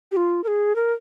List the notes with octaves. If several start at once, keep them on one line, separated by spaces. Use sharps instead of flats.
G4
F4
A#4
G#4
A#4